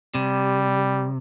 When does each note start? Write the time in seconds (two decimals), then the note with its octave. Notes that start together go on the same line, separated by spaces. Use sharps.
0.15 C3 G3